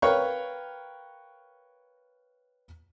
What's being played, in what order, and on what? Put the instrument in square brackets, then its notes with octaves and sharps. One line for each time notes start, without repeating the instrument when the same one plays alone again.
[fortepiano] A#4 B4 C#5 F5 G5 C#6